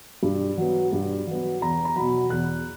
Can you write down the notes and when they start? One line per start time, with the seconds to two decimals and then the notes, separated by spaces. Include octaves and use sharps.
0.23 G2
0.57 F#3 B3
0.93 G2
1.27 F#3 B3
1.61 E2 A#5
1.85 A#5
1.96 B2 F#3 B5
2.30 E2 F#6